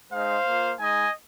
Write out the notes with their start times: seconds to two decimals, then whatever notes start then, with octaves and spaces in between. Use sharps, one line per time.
0.12 G#3 D#4 C5 F5
0.47 A#3 F4
0.80 G#3 D#4 D#5 G#5